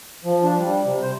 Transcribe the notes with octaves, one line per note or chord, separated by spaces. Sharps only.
F3
D4
G3
C3
C5